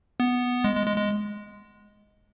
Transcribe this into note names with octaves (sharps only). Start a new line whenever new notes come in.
B3
G#3
G#3
G#3
G#3